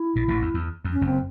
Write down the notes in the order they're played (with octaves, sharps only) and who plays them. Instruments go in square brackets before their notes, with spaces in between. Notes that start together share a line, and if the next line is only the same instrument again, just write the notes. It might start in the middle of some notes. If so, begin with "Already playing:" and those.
Already playing: [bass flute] E4
[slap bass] A#1 A#2
A1 A2
E2
E2
F2
[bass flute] C#4
[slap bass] F#1 F#2 [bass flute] C4